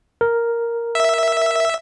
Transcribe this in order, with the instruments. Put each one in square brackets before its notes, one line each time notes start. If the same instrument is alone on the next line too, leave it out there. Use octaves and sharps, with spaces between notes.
[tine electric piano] A#4
[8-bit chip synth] E5